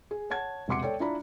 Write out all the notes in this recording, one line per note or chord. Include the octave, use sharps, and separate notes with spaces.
G#4
C#5 F#5 A5 G#6
E1 C3 F#5 C6 D6 C#7
A4 C#5 D5 G5
D4 E4 F4 D5 A#5 B5